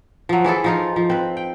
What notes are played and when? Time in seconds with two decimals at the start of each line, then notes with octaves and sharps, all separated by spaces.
0.29 F3 F#3
0.44 E3 E4 G#4 A4
0.64 F3 D#4 F4
0.96 F3
1.10 C4 B4
1.37 G5